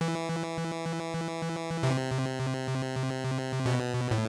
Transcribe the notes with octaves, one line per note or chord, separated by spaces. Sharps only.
E3
C3
B2
A2